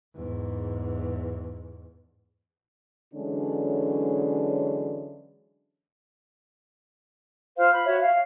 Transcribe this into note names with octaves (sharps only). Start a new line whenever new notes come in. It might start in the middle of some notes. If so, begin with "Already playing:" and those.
E2 G#2
D3 E3 F#3 G#3 C#4 D4
F4 C5 F5 F6
B5
F#4 C#5 E5
F5